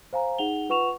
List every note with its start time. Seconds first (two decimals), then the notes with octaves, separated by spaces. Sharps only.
0.13 C5 F5 G#5 A#5
0.38 D#4 G#4 F#5 F7 G7
0.69 F4 B4 F#5 C#6 E7 F7